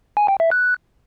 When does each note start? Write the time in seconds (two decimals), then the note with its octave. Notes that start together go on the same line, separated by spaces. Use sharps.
0.17 G#5
0.28 G5
0.40 E5
0.51 F#6